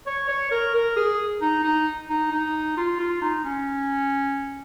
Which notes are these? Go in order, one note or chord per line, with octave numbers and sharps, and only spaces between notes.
C#5
C#5
A#4
A#4
G#4
D#4
D#4
D#4
D#4
F4
F4
D#4
C#4